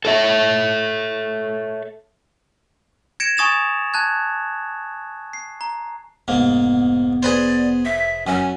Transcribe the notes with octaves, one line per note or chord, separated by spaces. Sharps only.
A4 C#5 E5
G#6 A#6 C#7 D7 E7
G#5 C#6 D#6 A6 E7 F7
A5 F#6 G#6
C7
A#5
F1 G#2 A#3 B3
G#4 B4 C5 D5
E5 B6
F#2 C#4 G#5